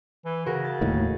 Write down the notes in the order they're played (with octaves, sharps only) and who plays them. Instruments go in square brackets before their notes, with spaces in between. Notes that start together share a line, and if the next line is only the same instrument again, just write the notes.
[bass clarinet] E3
[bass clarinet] C#3 [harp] F#4 A#4
[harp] A6
[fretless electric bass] D#2 A2 D#3